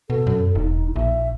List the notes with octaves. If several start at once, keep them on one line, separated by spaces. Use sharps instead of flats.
B2 A4
F#2
E1 D#4
A#1 E5